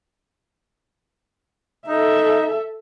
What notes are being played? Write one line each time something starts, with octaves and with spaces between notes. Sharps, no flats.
D#4 A4 E5